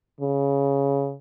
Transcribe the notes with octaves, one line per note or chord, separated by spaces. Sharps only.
C#3